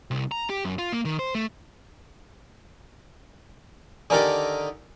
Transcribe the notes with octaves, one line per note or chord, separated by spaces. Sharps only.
C2
A#5
G4
F#2
F4
A#3
D#3
C5
A3
D3 D#3 G4 A4 A#4 G#5